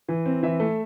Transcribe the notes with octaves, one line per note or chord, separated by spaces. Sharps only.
E3
C4
E3 E5
A3